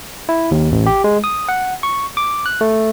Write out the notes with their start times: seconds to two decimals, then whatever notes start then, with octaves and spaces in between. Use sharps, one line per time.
0.29 E4
0.51 D#2
0.72 A1
0.86 G4
1.04 G#3
1.24 D#6
1.49 F#5
1.83 C#6
2.17 D6
2.46 F#6
2.61 A3